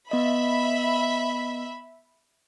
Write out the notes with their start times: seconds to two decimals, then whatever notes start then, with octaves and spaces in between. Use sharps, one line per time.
0.11 B3 D#5 E5 B5